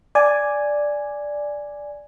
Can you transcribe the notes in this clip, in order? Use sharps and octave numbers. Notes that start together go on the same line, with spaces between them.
D5 G#5